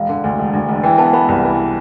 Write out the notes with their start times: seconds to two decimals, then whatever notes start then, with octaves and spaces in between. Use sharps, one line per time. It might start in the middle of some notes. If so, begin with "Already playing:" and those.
Already playing: E1 F5
0.09 D3
0.24 D2
0.39 E1
0.53 D2
0.69 E1
0.83 E3 G5
0.98 B3 A5
1.13 B3 B5
1.28 C2
1.44 E3